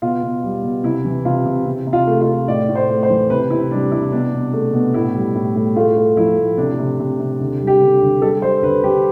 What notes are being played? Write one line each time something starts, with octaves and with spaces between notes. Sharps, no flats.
B2 F4
B2
G3
B2
C3 E4
E3
C3 F4
C3
C3
C3
F4
A3
F4
A3
A2 D5
A2
C5
A2
C5
E3
C3 B4
C3 E4
G3 D4
C3 E4
B2 D4
B2
A3
B2
A2 E4
G3
A2
A2
A3 F4
A3
F3 E4
A2
C3 D4
C3
C3
C3
D3
G3
G4
D3
D3
G3 A4
G3 C5
D3 B4
D3 G4